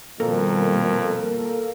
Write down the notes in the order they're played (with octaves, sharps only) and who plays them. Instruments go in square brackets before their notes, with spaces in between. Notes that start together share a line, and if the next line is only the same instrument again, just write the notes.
[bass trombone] F2 [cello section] B2 D#3 G3 [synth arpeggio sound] A#3 A4 A#4